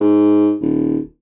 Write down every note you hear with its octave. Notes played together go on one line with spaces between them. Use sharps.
G#2
D#1